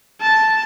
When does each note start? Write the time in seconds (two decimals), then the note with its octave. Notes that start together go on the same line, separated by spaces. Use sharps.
0.22 A5